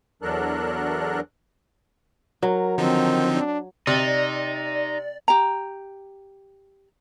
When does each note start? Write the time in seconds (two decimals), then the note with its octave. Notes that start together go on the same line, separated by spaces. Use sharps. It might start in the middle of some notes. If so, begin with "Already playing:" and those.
0.22 E2 F#3 D4 A4 A#4 F#6
2.43 F#3 A#4
2.78 D3 D#3 F3 C4 D#4
3.36 D4
3.87 C3 D#4 D5
5.28 G4 A#5